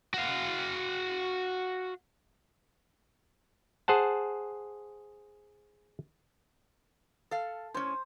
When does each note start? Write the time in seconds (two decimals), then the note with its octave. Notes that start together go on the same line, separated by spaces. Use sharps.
0.14 F#4 F5
3.88 G#4 C5 F#5 A5
7.31 A4 F5
7.74 A2 C#4 C5